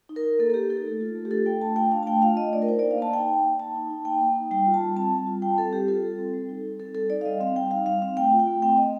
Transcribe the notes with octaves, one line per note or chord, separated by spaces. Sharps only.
D#4
A#4
D#4
A#3 A4
A4
A#3 G4
D#4 A4
A3
F4
A3
G4
D4 A4
A3 G5
F4 A5
A3 G5
D4 F5
A5
A3 G5
F4 F5
A3 D#5
D4 D5
A#4
D#4 C5
A#3 D5
F5
A#3 A5
D#4 G5
D#4
A#3
A#3 A5
D#4
D#4
A#3 G5
A#3
D#4
G3 G5
F4
A5
G3
C4 A5
G3
F4
G3 G5
C4 A4
G3 G4
F4 A4
G3
C4
G3
D#4
G3
C4 A4
G3 A4
D#4 D5
F5
G3 D#5
C4 F5
G3 G5
D#4 F5
G3 F5
C4 F5
A3 G5
F4
G5
A3
C4 G5
A3 D#5